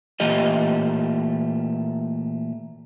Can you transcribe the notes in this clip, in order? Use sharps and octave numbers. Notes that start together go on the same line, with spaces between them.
A#2 E3 A3 G4 D#5